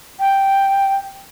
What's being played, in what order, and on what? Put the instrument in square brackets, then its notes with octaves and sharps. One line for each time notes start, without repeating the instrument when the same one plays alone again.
[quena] G5